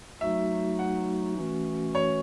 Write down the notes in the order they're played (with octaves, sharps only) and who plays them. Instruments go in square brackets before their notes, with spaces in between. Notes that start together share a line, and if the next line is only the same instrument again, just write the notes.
[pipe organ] F#3 A3 D#4 F#4 [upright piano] E5
[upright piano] F#5
[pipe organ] E3 A3 C#4 F#4
[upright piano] C#5